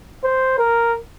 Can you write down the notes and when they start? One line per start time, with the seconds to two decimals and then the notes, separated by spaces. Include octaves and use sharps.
0.24 C5
0.58 A#4